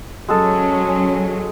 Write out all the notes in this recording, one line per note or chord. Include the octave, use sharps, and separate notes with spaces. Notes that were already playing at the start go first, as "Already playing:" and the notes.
F#3 G#3 C#4 G#4 A4